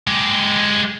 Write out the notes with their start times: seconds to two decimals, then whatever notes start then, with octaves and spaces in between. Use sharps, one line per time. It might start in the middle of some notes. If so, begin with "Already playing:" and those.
0.07 G#3 G4